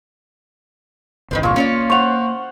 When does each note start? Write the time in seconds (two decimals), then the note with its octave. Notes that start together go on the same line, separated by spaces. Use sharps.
1.31 G1 C2 D#3 B4 C5
1.43 A#2 F4 C#6
1.56 A#3 C#4 C#5 D5
1.90 C5 F#5 C#6 F7